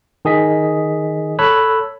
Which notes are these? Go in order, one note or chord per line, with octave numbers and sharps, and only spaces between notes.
D#3 G#4 D#5 B6
A4 C#5 B5 E6 F#6